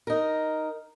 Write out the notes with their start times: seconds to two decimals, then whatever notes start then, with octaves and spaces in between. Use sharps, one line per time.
0.07 D#4 A#4